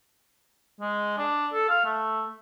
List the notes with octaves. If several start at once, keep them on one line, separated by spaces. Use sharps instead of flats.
G#3
D4
A4
F5
A3